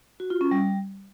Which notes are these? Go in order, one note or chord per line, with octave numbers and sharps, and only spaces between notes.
F#4
F4
C#4
G3